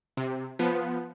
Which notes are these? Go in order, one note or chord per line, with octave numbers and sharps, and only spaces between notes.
C3
F3 B3